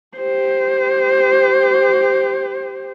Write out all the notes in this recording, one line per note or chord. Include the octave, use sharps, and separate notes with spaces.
G4 C5